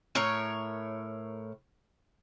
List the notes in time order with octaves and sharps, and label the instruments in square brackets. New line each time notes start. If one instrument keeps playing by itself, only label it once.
[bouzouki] A2 A#4 C#5